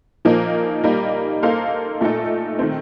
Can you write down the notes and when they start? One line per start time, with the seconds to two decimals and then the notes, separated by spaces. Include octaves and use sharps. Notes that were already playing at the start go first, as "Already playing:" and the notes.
0.25 A#2 F3 A#3 D#4
0.84 G3 A#3 D#4
1.42 A#3 D#4 A4 C5 F5
2.01 A#2 A3 D#4 A4
2.59 D#3 A3 C4